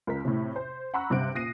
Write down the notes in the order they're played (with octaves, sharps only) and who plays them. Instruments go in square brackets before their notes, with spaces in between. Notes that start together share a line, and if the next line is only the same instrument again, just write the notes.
[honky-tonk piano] C#2 A#4 B6
A2 C3
C5
F#5 A#5 B5 C#6 E6 F#6
G2 C3 C5 F#6 D7
A#2 D#6 A#6 C7 D#7